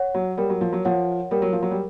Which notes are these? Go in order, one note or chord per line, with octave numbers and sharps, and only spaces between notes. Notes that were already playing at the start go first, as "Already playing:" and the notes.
Already playing: C#5 F#5
F#3
G3 A#4
F#3
F3
F#3
F3 C#5 F#5
G3 A#4
F#3
F3
F#3
G3